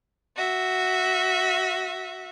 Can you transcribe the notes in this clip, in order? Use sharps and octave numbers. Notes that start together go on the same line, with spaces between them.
F#4 E5